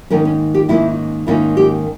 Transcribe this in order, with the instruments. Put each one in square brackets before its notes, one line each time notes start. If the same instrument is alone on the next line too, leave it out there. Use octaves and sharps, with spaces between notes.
[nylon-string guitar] G#2 D#3 A#3 C#4 A#4
C#4
G4
G#2 D#3 A#3 C#4 E4
G#2 D#3 A#3 C#4 E4
G4